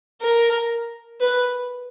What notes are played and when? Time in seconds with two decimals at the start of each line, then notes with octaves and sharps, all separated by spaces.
0.22 A#4
1.21 B4